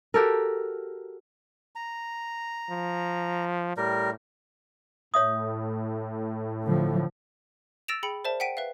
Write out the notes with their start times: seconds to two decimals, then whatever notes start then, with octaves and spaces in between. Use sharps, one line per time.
0.14 F#4 G4 A4 A#4
1.76 A#5
2.71 F3
3.77 A2 G3 A#4
5.14 A2 C#5 E5 D#6
6.64 D3 F3
7.88 E6 A6 A#6 D7 E7 F7
8.03 G#4 G5 B5 C#7 F#7
8.24 A#4 C5 D5 E5 A5
8.40 F#5 G5 B6 D7 D#7
8.57 B4 E5 F5